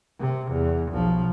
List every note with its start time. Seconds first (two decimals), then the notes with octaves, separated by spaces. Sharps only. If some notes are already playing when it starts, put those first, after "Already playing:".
0.20 C3
0.51 E2
0.92 B1 F3